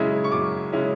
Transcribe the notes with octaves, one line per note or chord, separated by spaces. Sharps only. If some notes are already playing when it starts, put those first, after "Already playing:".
Already playing: F#2 C#3 G#3 C#4 E4
C#6
F#2 D6
C#3 G#3 C#4 E4